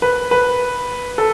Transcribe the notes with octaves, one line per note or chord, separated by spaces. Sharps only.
B4
B4
A4